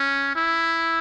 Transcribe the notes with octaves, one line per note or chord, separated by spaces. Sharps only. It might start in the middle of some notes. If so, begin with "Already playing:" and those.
Already playing: C#4
E4